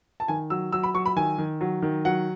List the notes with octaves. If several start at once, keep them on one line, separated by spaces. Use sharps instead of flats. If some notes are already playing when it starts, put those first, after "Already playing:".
A5
D#3 G#5
F#3 E6
F#3 E6
B5
F#3 C#6
B5
D#3 G#5
D#3
F#3
D#3
F#3 F#5